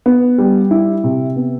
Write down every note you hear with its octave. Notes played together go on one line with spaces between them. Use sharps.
B3
G3
E4
C3
B3